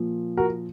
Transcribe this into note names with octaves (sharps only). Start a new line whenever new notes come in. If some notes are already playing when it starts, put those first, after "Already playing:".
Already playing: A#2 F3
F#4 A#4